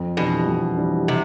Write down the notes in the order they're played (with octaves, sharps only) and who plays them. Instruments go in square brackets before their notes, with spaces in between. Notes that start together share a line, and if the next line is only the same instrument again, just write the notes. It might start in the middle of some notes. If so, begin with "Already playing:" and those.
Already playing: [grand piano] F2
[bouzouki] B2 [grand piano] E3 G3 D4
[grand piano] F2
E3 G3 D4
[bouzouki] C3